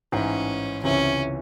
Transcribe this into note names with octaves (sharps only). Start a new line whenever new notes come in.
A1 G#2 E3 C#4
C#2 C3 E3 C#4